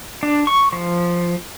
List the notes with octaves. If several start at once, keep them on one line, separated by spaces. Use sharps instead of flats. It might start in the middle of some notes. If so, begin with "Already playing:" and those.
D4
C#6
F3